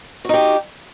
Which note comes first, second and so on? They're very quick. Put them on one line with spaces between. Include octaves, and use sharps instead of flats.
F#4 D#4 G4